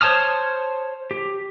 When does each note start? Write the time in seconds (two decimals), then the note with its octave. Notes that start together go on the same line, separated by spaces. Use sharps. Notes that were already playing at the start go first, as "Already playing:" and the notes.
0.01 C5 C#5 A5 D#6 F6
1.11 G4